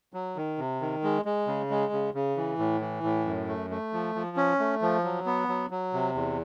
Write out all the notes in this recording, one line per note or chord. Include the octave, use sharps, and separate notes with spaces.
F#3
D#3
C3
D#3
G#3
G#3
C#3
G#3
C#3
C#3
E3
A2
E3
A2
F#2
A3
A3
F3
F3
C#4
A3
F3
F#3
B3
F#3
F#3
C3
E2